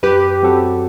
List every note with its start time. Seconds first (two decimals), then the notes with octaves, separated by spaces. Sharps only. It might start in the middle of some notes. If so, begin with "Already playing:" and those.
0.03 F#2 G4 B4
0.42 F#3 C4 F#4 A4